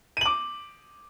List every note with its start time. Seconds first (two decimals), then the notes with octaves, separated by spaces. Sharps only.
0.17 D#7
0.21 F#7
0.26 D6